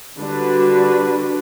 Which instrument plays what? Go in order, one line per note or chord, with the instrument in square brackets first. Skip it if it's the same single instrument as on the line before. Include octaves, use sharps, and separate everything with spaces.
[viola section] D3 G3 D4 F#4 B4